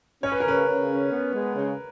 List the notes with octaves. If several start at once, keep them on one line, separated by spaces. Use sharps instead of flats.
C#4 C#5
B4
A#4
C#3 B4
C#3
C#4
B3
G#3
C#3